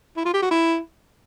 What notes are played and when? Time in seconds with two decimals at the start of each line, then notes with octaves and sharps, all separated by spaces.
0.17 E4
0.25 F4
0.34 G4
0.42 F#4
0.51 E4